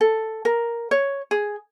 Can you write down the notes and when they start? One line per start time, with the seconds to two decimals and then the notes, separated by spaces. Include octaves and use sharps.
0.01 A4
0.45 A#4
0.91 C#5
1.31 G#4